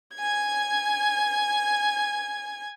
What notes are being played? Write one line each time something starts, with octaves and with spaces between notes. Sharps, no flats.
G#5 G#6